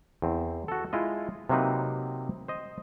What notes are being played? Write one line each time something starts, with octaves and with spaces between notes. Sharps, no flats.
E2 C4
F#4 A4
G#3 E4 F4 D#5
C3 F#3 A#3 C4 D#4 B4
C5 D#5